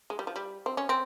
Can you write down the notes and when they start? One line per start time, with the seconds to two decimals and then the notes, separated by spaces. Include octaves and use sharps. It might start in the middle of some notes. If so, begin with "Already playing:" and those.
0.10 G#3
0.19 G3
0.27 F3
0.36 G3
0.66 C4
0.77 C#4
0.89 C4